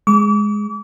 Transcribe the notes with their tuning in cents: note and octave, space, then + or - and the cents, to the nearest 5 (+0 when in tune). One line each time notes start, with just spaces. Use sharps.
G#3 +0 D6 -40